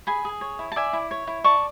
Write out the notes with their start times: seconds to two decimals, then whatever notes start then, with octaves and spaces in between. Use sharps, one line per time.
0.07 G#4 G#5 B5
0.25 G#4
0.41 C#5
0.59 E4
0.72 A5
0.76 D5 E5 G#5
0.93 E4
1.11 C#5
1.27 E4
1.44 D5 A5 C#6